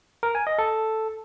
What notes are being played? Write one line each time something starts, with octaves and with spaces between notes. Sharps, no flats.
A#4
G#5
D#5
A4